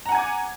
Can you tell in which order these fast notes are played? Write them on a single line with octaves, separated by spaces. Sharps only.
A#5 F#5 G#5 G#6 D6